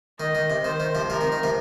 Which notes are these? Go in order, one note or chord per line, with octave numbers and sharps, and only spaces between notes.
D#3 D#5
D#3
C3
D#3 C5
D#3
C3 F3
C3 F3 A#4
D#3
D#3
C3 F3